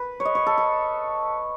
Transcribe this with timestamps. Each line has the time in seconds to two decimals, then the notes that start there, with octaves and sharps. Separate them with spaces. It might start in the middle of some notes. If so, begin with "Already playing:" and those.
Already playing: B4
0.20 C#5
0.25 D#5
0.35 C#5
0.46 A4
0.58 A4